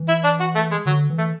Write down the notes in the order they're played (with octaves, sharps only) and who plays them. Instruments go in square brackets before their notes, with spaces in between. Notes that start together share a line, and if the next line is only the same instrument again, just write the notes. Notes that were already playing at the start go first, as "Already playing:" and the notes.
Already playing: [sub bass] E3
[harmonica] E4
D4
F#4
A3
G#3
[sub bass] D3 [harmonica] F#3
[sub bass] E3
[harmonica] A3